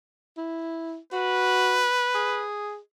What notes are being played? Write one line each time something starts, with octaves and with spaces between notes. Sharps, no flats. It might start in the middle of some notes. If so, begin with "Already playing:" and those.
E4
F#4 B4
G#4